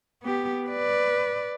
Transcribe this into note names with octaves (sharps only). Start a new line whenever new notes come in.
B3 G4
B4 D5